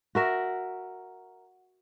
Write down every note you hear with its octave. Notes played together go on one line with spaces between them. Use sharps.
F#4 A#4 E5